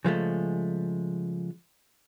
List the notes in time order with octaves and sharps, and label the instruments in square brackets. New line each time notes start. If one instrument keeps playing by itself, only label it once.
[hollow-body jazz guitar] C#3 F3 G#3 A3